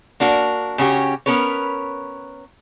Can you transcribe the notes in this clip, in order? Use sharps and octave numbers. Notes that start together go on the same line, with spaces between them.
A#3 D4 F#4 A#4
C#3 C#4 F#4 G4
B3 C#4 A#4 B4 C#5